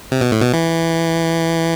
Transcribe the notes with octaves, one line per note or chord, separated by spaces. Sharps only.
C3
B2
A2
B2
E3